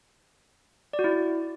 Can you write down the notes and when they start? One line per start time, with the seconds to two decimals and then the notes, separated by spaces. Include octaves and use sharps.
0.93 D5
0.99 F#4
1.04 E4